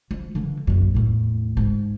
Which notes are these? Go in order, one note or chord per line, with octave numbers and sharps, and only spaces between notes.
F3
D3 E3
A#1 F#2
E2 A2
G#2 G#3